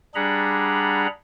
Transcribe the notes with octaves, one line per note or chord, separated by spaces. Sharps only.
G3 D4 G#4 F#5 A#5 B5